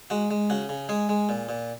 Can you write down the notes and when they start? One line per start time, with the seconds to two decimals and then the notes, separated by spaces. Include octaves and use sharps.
0.10 G#3 F#4
0.31 G#3
0.50 C#3 F#4
0.69 C#3
0.89 G#3 G#4
1.09 G#3
1.29 A#2
1.49 A#2